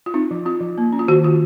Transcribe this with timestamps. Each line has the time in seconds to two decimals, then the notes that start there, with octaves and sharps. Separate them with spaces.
0.06 F4
0.14 C4 D#4
0.31 F3
0.45 C4 F4
0.61 F3
0.78 A#3
0.93 C#4
0.99 F4
1.08 D#3 F#4
1.23 D#3 F4